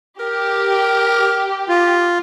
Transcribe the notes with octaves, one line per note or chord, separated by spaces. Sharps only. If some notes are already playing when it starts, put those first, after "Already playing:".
G4 A#4
F4